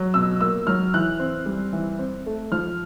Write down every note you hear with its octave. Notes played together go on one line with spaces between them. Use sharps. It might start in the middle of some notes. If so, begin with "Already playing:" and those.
Already playing: F#3
B2 E6
A#3 E6
F#3 F6
E3 F#6
C4
G3
E3
C4
A3
F3 F6